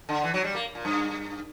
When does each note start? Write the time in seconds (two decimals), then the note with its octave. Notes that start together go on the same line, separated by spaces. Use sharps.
0.09 D3
0.24 E3
0.34 F#3
0.44 G3
0.55 A#3
0.75 A#2
0.85 G2